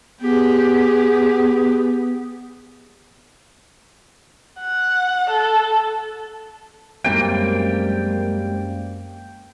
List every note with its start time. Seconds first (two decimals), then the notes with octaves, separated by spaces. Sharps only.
0.21 B3 G4 G#4
4.60 F#5
5.30 A4
7.04 F#2 G3 G#3 A#3 C4 G5